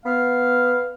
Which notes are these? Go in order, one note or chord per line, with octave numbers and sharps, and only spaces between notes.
B3 F5